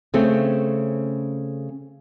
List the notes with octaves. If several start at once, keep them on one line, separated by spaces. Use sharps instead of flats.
C#3 A3 C4 C#4